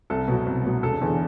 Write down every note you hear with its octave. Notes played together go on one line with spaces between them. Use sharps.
C2 A4
B2 F#3
C2
B2 F#3
E1 A4
E2 D3